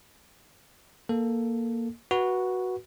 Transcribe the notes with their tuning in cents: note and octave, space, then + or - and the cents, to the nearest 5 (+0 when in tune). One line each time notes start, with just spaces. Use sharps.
A#3 +0 A4 +5
F#4 +0 B4 -20